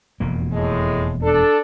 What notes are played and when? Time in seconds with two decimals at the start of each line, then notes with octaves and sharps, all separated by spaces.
0.20 E1 F2 A#3
0.53 A2 G#3
1.22 D4 A4